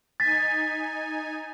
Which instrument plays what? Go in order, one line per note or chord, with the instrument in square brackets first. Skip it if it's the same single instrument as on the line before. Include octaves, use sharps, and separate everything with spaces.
[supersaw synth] D#4 G#5 [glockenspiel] A6 B6